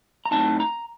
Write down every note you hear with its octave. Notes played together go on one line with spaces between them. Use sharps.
A#5
A2 F#3 C4 D#4 A5
A#5